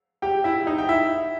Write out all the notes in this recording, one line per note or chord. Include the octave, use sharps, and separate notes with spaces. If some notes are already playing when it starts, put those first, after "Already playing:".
G4 G5
E4 E5
D#4 D#5
G5
E4 E5